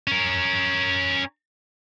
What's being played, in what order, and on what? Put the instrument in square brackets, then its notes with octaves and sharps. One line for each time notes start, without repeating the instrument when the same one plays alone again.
[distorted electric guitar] C#4 A#4